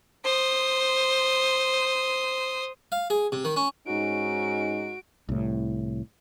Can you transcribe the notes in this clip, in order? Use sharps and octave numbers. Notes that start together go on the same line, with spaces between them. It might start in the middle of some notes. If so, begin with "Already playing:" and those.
C5 D#6
F5
G#4
C3
D#3
C#4
G#2 C#4 D#4 F#4 D7
C2 A2